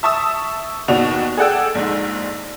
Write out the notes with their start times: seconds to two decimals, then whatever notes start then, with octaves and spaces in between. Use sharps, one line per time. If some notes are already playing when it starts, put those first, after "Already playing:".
0.03 E5 A5 C#6 D#6 E6
0.88 D#2 B2 D4 F#4 F7
1.37 G#4 A4 D5 F#5 G5 E6
1.75 A#1 G#2